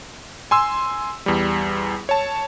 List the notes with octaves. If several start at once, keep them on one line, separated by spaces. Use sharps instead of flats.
G#5 C6 E6
E2 G3
C#5 A5